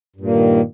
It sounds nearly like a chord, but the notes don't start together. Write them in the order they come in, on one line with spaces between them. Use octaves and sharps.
G2 A#2 A#3 D#3